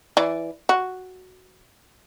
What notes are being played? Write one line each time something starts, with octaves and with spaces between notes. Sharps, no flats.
E3 D5
F#4